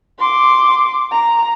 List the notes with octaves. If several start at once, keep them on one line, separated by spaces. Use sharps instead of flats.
C6 D6
A#5